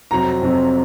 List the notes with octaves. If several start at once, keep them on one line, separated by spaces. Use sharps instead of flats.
F2 C3 F#3 C4 A#5
F2 C3 F#3 C4